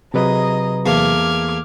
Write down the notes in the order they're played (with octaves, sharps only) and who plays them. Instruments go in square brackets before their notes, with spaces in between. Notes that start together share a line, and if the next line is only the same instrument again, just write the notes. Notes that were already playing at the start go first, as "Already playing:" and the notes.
[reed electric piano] C3 F#3 B4 [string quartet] G#4 D#5 A#5
[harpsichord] E2 A3 A#3 [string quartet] D6 F6 G#6